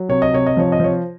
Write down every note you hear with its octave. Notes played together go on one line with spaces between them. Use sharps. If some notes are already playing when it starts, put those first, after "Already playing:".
Already playing: F#3
C3 C#5
D#5
C3 C#5
D#5
F3 C#5
D#5
F3 C#5